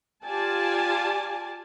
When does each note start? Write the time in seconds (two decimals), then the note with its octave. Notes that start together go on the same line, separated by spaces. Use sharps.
0.24 F4 G4 D5 G#5 A5